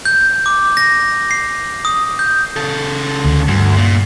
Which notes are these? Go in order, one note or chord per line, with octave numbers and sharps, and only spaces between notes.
G6
D6
A#6
C7
D#6
G6
C#3 A4
D2
D2 G2
A#2